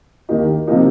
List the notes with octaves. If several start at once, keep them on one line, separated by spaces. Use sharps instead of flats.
D#2 D#3 A#3 D#4 G4
C3 F3 A#3 D#4 G4